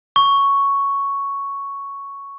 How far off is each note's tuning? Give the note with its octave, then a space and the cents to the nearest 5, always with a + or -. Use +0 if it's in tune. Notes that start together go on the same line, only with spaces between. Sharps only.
C#6 +5